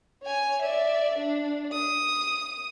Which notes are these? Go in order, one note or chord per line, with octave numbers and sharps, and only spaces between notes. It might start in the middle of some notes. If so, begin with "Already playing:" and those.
C#5 G#5
D5 E5
D4
D#6